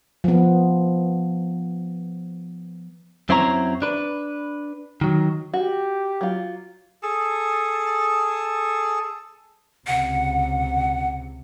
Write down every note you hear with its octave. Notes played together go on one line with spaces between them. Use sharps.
F3 B3
F#2 C4 E4 C5 C#5 A#5
D4 B4
D#3 F#3
F#4 G4
F#3 F4
G#4 A4 A5
C#2 C3 F#5